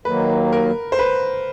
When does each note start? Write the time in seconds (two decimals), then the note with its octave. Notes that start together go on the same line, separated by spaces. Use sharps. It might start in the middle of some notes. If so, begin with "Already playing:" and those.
0.05 D#2 D#3 F#3 A#3 B4
0.53 A#4
0.92 C5
0.99 B4